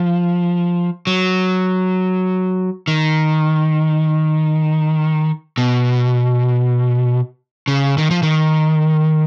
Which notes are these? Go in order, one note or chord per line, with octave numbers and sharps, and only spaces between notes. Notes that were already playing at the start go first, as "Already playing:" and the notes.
Already playing: F3
F#3
D#3
B2
C#3
D#3
F3
D#3